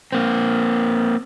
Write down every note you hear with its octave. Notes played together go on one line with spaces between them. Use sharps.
A#3 C4